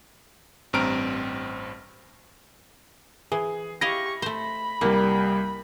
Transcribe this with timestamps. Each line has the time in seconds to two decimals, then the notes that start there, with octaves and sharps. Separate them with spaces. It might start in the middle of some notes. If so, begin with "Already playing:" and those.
0.73 A1 G2 C4 A#5 F6 D7
3.32 E3 G#4
3.81 E4 G4 D#5 F5 C#6 A#6
4.22 A3 C5 B5
4.81 C2 G3 A#3